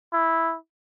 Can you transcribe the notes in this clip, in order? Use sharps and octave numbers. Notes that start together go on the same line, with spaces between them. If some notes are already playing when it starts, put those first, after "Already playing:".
E4